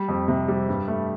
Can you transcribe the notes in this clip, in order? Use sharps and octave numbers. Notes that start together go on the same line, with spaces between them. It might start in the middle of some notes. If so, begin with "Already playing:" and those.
Already playing: G3
F2
C3
G3
G2
A3